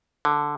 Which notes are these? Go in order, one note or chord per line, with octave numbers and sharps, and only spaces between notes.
D3